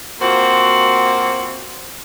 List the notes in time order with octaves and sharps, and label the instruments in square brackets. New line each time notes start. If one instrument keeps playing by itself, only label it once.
[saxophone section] A#3 C4 F4 F#4